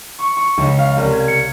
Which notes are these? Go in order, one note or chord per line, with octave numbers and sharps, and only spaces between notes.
C#6
C#6
C#2
F5
C2
G#6
C#7